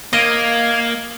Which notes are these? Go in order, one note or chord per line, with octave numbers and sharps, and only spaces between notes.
A#3 D#5 F5 G#6